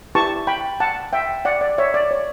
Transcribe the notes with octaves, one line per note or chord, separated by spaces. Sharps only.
E4 G4 B4 A5 C#6
G5 B5
F#5 A5
E5 G5
D5 F#5
D5
C#5 E5
D5
C#5